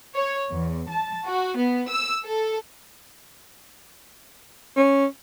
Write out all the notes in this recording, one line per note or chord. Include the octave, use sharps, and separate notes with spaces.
C#5
E2
A5
F#4
B3
E6
A4
C#4